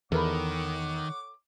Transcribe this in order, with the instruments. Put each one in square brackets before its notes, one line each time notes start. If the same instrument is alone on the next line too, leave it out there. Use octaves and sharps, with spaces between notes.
[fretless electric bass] E2 [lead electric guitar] D#3 [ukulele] A4 A#4 B5 [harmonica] C#5 F#5 D6